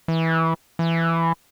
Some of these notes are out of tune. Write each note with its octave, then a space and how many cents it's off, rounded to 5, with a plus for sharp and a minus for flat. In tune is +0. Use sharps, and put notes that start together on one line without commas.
E3 -15
E3 +15